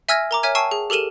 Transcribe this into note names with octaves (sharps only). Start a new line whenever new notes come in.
E5 G#5 E6 F6 G#6 A#6
A#4 A#5 D6
C#5 E5 G#5 F6 G#6
G5 A5 C#6 E6 C7 D#7
G#4
G4 A4 A#4 D#7 E7